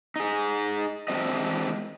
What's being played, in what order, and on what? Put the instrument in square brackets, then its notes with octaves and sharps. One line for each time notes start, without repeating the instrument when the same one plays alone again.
[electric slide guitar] D#4 G#4
E2 G#3 C4 D4 D#5